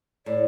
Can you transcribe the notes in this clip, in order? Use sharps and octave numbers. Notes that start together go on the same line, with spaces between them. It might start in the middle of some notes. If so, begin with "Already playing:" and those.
A2 D5